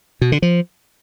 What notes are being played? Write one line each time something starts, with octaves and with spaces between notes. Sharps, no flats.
B2
D3
F3